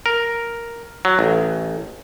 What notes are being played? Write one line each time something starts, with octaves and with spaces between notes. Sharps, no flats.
A#4
F#3
A1